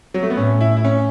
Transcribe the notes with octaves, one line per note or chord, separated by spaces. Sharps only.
F#3
A3
B3
A2 C#4
E4
E4
C#4